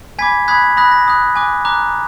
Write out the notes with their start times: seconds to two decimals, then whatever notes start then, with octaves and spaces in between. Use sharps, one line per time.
0.19 G#5 B5 D6 G#6 B6
0.48 B5 D#6 F#6 G#6 B6
0.77 B5 D#6 F#6 A#6
0.92 A#6
1.07 B5 D#6 F#6
1.36 G#5 D6 F#6
1.65 A#5 D6 F#6